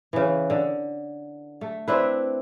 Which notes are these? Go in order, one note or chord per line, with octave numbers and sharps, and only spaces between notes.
C#3 E3
D3
A3
C4 D4 E4 B4